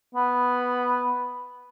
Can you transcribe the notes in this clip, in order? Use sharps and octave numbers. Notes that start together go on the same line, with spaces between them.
B3